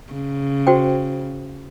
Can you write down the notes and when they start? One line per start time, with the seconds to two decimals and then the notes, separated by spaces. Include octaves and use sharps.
0.13 C#3
0.67 F#4 C5 G5